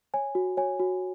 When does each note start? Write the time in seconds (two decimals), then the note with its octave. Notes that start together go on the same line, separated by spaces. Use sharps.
0.14 C#5 G#5
0.35 F#4
0.57 C#5 G#5
0.80 F#4